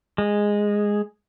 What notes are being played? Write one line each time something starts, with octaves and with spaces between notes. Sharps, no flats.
G#3